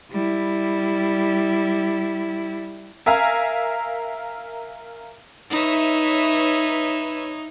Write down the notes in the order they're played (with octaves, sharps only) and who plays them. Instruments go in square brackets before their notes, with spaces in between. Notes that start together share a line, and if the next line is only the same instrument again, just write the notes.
[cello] G3 E4
[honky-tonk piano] A#4 E5 F5 G#5 A#5
[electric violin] D#4 [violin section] B4 C#5 E5